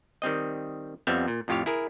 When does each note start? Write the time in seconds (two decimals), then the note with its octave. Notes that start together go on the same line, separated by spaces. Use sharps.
0.22 D#3 G3 C4 D#5
1.07 F2 G3 B3 C4 E5 F5
1.28 A#2
1.48 F2 A2 F4 G4 C#5 F5
1.66 E4 G#4 A#4